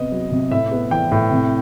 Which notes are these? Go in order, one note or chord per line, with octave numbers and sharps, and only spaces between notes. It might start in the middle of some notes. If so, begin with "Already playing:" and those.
Already playing: C3 B3 D#5
F#3
C3
A2 E5
B3
E3 G5
A2
C3